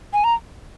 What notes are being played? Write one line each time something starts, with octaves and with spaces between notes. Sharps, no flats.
G#5
A#5